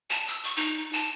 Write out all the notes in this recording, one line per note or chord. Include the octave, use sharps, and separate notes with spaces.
A5
E6
C#6
D#4
A5